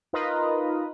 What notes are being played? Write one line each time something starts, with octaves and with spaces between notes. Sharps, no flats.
D#4 F4 A#4 B4 D#5